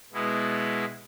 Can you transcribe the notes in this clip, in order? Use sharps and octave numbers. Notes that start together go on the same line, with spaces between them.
B2 G#3 B3 E4